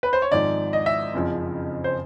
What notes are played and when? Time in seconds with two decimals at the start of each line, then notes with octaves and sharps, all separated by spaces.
0.03 B4
0.13 C5
0.22 C#5
0.32 G#1 G#2 F3 D5
0.73 D#5
0.86 E5
1.13 F#1 F2 C#3 F3
1.84 C5